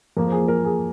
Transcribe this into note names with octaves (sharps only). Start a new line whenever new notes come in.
F2 F3 A#3 A#4
G#4
A#4
G#4